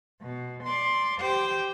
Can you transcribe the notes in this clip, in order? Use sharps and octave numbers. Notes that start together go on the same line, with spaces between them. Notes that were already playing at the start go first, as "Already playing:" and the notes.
B2
D5 C6
G4 C5 G5